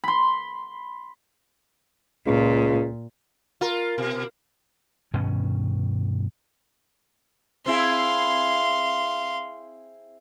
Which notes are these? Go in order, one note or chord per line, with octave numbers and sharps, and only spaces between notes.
B5 C6
C#2 A#2
F4 A#4
B2
G2 B2 D#3 C#4
C4 E4 G#4 F5 C6